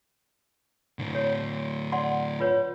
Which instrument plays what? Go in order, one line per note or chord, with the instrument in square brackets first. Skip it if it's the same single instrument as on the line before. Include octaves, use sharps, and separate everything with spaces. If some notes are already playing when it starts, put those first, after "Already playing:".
[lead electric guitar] A2 D3
[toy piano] C#5
D5 F#5 C6
F4 B4 C#5